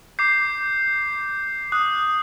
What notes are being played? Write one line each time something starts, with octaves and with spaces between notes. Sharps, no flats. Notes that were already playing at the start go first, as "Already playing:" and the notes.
D6 G6 C7
D#6 F#6